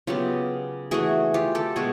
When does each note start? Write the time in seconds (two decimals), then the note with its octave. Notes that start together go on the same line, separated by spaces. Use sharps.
0.07 C#3 F#3 B3 F4 G4
0.91 E3 A3 F#4 G#4
1.34 F4 G4
1.55 G4 A4
1.76 B2 G#3 F#4 G#4